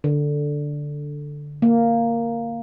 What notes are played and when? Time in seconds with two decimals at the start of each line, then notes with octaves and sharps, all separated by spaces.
0.04 D3
1.62 A#3